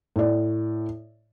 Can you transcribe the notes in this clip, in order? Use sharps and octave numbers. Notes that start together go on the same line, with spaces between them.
A2 D5